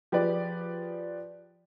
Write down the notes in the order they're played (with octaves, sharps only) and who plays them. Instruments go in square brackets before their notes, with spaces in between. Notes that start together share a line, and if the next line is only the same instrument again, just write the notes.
[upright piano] F3 G4 G#4 B4 D5